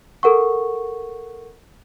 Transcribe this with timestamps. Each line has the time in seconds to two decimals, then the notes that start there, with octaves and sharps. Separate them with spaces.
0.23 A4 A#4 F#5 C#6